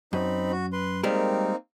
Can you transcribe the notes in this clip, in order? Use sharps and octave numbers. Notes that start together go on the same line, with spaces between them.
F#2 C4 D#4 B5
F#4
B4 C6
G3 G#3 A#3 C4 D#4 A#4